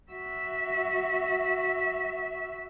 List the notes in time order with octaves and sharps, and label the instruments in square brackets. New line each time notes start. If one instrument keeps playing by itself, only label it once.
[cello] F#4 E5